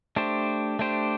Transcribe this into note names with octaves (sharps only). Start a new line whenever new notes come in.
A3 D4 G4 C5
A3 D4 G4 C5